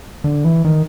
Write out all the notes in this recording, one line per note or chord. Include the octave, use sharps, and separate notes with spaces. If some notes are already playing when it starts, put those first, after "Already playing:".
D3
E3
D#3